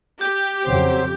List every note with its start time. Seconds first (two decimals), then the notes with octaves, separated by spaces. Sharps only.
0.21 G4 G6
0.64 F2 C#3 F#3 C4 C5